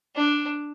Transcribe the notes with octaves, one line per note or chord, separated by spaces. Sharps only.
D4